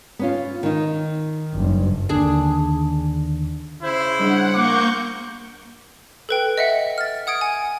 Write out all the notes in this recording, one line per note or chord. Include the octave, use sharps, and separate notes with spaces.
B3 C#4 F4
D#3 D#4
F#1 G2
D#2 D3 D#3 D4 G#4
C#3 E4 C5
G3 D4 G#4 F#5
A#3 C#6 D6 G6
A4 B4 G5
D#5 E5 F#5
F6 A6
F#5 D#6 G#6 D7
G#5